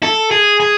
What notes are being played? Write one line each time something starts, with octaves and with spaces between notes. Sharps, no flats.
A4
G#4
G#4